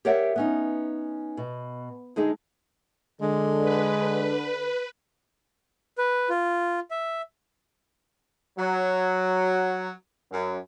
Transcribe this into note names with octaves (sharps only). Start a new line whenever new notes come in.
G4 A#4 C#5 D5 E5 F#5
B3 C#4 D#4
B2
D3 G#3 D#4 G#4
D3 G#3
B4
B4
F4
E5
F#3
F#2